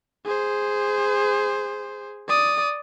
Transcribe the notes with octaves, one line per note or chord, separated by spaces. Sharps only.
G#4 C5
D5 D#6